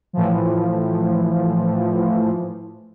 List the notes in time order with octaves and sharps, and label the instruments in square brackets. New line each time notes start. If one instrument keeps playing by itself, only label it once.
[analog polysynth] A2 E3 F3